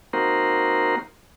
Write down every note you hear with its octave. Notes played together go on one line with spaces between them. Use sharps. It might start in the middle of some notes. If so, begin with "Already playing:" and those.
A#3 C4 D#4 F#4 A#4 C5